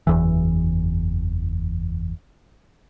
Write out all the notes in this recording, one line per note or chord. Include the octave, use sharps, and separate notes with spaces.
F#1 E2 E3